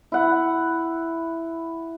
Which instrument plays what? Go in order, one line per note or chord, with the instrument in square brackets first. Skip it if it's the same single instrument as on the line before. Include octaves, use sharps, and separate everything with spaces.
[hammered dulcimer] E4 F#5